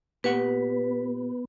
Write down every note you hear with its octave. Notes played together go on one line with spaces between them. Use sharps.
A#2 B3 G4 B4 F#5